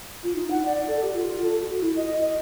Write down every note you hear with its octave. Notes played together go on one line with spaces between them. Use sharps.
F4
D#4
F#5
D5
A4
G4
F4
A4
F#4
E4
D#5
D#5